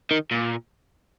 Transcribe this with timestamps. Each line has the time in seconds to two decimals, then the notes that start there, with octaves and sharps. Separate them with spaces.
0.11 D#3
0.31 A#2